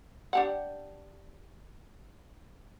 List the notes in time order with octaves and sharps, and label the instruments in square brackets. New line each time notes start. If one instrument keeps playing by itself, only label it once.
[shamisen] D4 G4 F#5